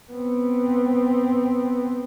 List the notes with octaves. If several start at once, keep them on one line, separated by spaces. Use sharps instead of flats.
B3 C4